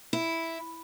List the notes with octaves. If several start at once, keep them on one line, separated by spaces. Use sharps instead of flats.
E4